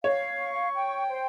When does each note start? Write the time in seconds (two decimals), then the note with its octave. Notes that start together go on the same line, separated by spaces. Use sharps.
0.03 C#5 F5
0.38 C#6
0.73 G5
1.08 C5